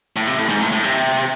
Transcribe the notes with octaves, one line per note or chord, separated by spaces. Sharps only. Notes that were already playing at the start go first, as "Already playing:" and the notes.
A2
C3
A2
G#2
A2
A2
C3